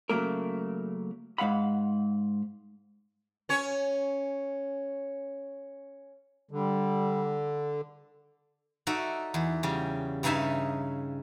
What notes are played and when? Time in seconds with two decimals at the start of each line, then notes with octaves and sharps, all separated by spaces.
0.10 C#3 F#3 A3 A#3 A#4
1.38 G#2 A3 F5 F#5 B5
3.49 C#4 C#5
6.51 D3 G3
8.87 D#4 F#4 A4 D5 E5
9.34 E2
9.63 C#3 G3
10.23 G2 C#3 D#4 E5 G#5 A5